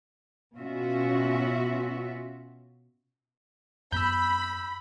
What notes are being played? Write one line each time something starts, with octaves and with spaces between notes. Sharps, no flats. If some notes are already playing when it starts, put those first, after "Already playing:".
B2 C#4 F4 F#4 E5
F#2 B3 B5 E6 G6